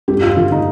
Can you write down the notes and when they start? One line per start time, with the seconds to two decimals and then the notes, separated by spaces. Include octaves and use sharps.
0.08 G2 G4
0.22 F4
0.37 D3 F4
0.52 D#4